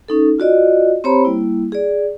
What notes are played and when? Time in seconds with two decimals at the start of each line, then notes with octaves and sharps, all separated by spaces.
0.08 C#4 D#4 A4
0.38 F4 F#4 D5 D#5
1.04 C4 G4 C5 C#5 A#5 B5
1.25 G3 A#3 E4
1.72 G#4 D5